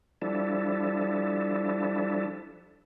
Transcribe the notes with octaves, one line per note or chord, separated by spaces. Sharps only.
F3 G3 D4 E4 A4